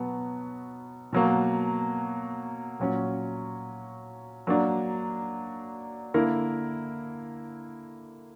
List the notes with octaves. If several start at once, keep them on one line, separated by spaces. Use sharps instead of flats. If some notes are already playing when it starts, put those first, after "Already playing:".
Already playing: B2 F#3 B3
B2 F#3 A#3
A#2 F#3 C#4
F#3 A#3 D4
D3 A#3 E4 A#4